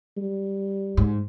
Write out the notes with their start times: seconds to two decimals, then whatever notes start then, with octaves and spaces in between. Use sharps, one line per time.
0.17 G3
0.97 G#2